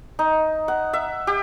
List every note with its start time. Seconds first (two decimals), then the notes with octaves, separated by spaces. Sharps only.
0.19 D#4
0.68 F#5
0.93 E5
1.27 G4